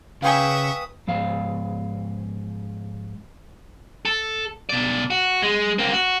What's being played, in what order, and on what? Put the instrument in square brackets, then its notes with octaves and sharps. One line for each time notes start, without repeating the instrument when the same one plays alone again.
[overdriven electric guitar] C#3 [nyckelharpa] B4 D#6 [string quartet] E5 C#6 [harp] F5 G5 G#5
[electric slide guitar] G#2 F3 F5
[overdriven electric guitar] A4
B2 D5
F#4
G#3
A#3 C4
F#4